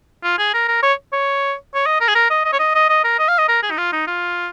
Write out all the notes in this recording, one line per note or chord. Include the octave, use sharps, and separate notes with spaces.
F4
G#4
A#4
A#4
C#5
C#5
C#5
D#5
A#4
G#4
A#4
D#5
D#5
C#5
D#5
D#5
D#5
A#4
D#5
F5
D#5
A#4
G#4
D#4
F4
D#4
F4